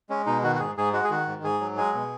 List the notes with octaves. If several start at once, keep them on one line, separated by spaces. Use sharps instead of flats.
G#3 C#4
B2 D#4
D#3 F#4
F#4
G#2 G#4
G#2 G#4
G#3 F#4
G#4
D#3 F#4
G#2
G#2 G#4
F#3
G#3 G#4
B2